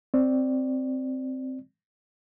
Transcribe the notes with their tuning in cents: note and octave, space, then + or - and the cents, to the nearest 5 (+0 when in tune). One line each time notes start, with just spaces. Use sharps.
C4 +0 D5 +0